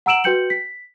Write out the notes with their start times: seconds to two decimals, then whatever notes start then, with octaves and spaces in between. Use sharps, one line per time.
0.06 F#5 A#5 E6 D7 E7 F#7
0.24 F#4 B4 G5 G6 C#7 F#7
0.50 B6